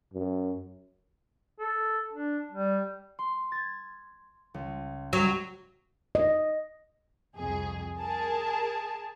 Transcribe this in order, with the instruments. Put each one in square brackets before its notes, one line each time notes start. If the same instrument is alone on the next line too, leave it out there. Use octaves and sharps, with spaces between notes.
[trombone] F#2
[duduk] A4
D4
G3
[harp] C6
G#6 A6
C#2
[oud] F#3 [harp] G3
[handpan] D#5
[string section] C2 F2 G#4
G#4 A#4 A5